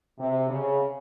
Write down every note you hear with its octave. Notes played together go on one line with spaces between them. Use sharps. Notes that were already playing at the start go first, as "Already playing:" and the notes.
C3
C#3